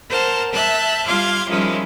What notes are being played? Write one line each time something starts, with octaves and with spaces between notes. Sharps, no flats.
A#4 C5 F#5 A5
E5 A5 F#6 G6
G3 F4 F5 C6 D6 G#6
D#3 F3 G3 G#3 C#4 E4